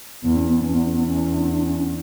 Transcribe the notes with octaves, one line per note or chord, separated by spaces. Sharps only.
E2 B3
C#4
B3
E2 C#4
B3
C#4
D4
D4
C#4